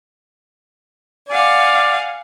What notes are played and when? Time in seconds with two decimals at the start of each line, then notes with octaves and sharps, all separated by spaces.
1.29 D5 F5 F#5 G#5